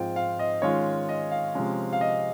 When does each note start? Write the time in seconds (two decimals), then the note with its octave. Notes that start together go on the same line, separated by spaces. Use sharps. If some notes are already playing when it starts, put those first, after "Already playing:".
Already playing: G#2 F3 C4 F4 G5
0.16 F5
0.39 D#5
0.62 D#3 G#3 C#4 F4 C#5
1.09 D#5
1.31 F5
1.55 C3 F3 G#3 C#4
1.93 F5
2.01 D#5